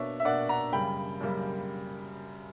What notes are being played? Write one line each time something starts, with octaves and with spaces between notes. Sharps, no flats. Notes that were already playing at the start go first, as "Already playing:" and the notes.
Already playing: B2 A#3 D4 C#5 E5
E5
B2 A#3 D4 D5 F#5
F#5 A#5
F#2 C#3 G3 A#3 G5 B5
F#2 C#3 G3 A#3